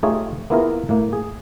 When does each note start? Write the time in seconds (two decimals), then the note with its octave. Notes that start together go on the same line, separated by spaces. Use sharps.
0.03 A3 D#4 F4 G4 G#4 C#5
0.50 A#3 B3 E4 F4 G#4 A#4
0.89 A2 A#3
1.13 G#4